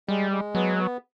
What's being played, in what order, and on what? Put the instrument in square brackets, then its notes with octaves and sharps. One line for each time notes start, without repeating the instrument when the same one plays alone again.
[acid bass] G3 [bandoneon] G#3
[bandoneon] G#3
[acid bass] F#3 [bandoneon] B3
[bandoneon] B3